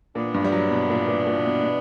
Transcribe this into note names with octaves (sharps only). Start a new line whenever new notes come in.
A#2 E3 B3 D4
G2
G3
F#3
B2
A#2
A#2
A#2
B2
B2